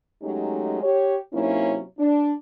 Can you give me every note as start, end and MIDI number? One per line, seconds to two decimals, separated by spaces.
0.23 0.81 54
0.23 0.81 56
0.23 0.81 57
0.23 0.81 61
0.23 0.81 63
0.23 0.81 67
0.83 1.18 67
0.83 1.18 73
1.34 1.82 48
1.34 1.82 54
1.34 1.82 58
1.34 1.82 61
1.34 1.82 63
1.34 1.82 64
1.99 2.33 62